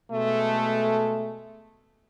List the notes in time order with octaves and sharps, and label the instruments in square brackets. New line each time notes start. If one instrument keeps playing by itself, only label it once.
[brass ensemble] B2 G#3 A3